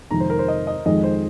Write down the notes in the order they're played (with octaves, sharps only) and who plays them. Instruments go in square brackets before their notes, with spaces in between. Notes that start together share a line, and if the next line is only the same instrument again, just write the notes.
[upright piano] F2 C3 D#3 G#3 [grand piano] A#5
[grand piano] C5
A#4
C5
D#5
D#5
[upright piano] F2 D#3 G#3 [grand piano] D#5
[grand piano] C5